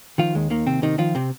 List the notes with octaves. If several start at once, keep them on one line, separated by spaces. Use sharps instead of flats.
D#3 F3 F4
D#2 G#3
D#3 A#3
D#2 C3 C4
C3 D#3 D#4
D#3 F3 F4
C3 C4